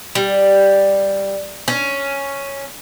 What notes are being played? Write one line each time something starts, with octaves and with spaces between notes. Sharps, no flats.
G3
C#4